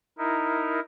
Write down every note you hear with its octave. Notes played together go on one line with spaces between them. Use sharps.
D#4 E4 A#4